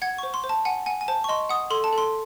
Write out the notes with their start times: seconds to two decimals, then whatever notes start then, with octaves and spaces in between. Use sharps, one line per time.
0.02 F#5 G#6
0.18 C5 C#6
0.34 C6
0.44 C5
0.49 A5
0.65 F#5 G#5
0.86 F#5 G#5
1.01 G#5
1.08 C5 A5
1.24 C#6
1.29 D#5 C6
1.49 F#5 D#6
1.70 A4 C6
1.84 A5
1.93 A4 C6